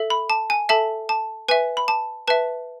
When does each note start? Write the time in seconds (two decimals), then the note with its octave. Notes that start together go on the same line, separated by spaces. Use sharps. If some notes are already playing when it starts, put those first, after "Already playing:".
Already playing: A4 E5
0.10 B5
0.30 A5
0.50 G#5
0.69 A4 E5 A5
1.09 A5
1.48 B4 E5 G#5
1.77 B5
1.88 A5
2.28 B4 E5 A5